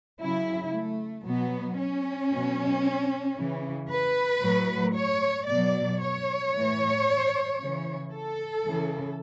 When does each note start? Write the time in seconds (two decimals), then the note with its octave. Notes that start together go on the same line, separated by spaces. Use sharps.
0.20 C#3 F#3 E4
0.74 A3
1.26 B2 F#3 B3
1.78 C#4
2.32 B2 F#3
3.37 C#3 E3
3.90 B4
4.42 A2 F#3
4.95 C#5
5.47 B2 F#3 D5
6.01 C#5
6.54 A2 E3
7.58 C#3 E3
8.12 A4
8.63 C#3 E3